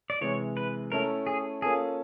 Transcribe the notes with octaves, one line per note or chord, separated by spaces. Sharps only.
D5
C3 E3 G#3 C#5
B4
A3 C#4 E4 A4 A#4
G#4
A#3 C#4 F4 G#4 A4